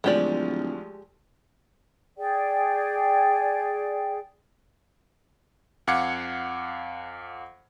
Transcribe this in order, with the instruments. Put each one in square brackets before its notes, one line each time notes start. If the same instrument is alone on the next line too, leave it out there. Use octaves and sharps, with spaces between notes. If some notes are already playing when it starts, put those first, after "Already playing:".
[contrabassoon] D1 [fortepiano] D2 F3 [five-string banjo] G#3 G4 D5
[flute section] G#4 D5 G5
[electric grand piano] F2 F5 F#5 D6 G#6 C#7